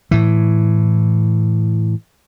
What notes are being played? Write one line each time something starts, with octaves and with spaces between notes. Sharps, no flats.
A2 E3